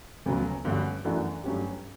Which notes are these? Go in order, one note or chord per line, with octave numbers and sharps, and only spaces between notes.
D2 C#3 F#3 B3
G2 D3 A3 C#4 F#4
F#2 E3 A3 D4 F#4
G2 F#3 A3 C#4 G4